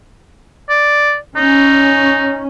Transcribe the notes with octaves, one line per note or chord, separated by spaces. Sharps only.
D5
C#4 D#4